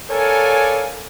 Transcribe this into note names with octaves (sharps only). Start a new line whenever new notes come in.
A4 A#4 C#5 D5 F5 G#5